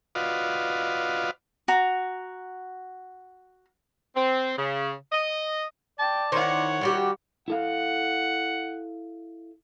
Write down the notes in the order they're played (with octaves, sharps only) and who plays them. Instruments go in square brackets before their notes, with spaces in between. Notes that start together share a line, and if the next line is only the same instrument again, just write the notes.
[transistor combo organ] F4 F#4 B4 D5 D#5 F5
[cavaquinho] F#4 A#5
[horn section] C4
C#3
D#5
[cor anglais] D5 [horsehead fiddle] G5 [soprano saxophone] A5
[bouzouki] D#3 C5 [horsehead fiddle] E4 F#5 [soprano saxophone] C#5
[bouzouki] D#3 F#4 G4 [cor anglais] G3
[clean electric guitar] E4 A4 F5 [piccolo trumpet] F#5